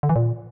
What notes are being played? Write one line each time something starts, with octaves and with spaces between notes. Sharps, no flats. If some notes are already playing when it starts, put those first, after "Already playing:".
D3
E3
A#2